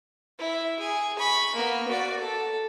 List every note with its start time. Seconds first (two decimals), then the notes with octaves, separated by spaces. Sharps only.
0.39 E4
0.80 G#4
1.19 B5 C#6
1.55 A#3 B3
1.88 F#4 D5
2.19 A4